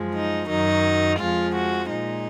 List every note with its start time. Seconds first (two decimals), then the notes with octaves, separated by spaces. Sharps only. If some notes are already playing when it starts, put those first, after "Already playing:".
Already playing: F#2 F3 G#3
0.15 D#4
0.49 F#2 D#3 F#3 D#4
1.19 F2 F3 G#3 F4
1.55 F#4
1.90 A#2 G#3 D#4